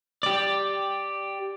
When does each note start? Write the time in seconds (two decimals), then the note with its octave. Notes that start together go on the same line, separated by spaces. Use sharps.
0.23 G4 D5